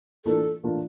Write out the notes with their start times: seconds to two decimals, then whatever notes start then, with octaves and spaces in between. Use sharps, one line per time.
0.26 A2 E3 A#3 D4 F4 A4
0.64 A2 E3 A#3 D4 F4